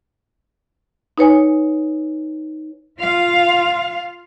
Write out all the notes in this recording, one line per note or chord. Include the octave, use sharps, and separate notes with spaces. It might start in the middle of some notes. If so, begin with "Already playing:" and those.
D#4 B4 C#5 G#5
F4 F5